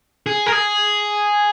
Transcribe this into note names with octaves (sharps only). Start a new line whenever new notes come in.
G#4
A#4
G#4